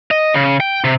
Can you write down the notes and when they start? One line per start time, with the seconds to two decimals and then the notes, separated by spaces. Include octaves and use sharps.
0.11 D#5
0.34 C#3
0.60 G5
0.84 C3